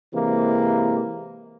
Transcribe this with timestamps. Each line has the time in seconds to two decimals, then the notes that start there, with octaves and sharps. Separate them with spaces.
0.14 C3 E3 G#3 A#3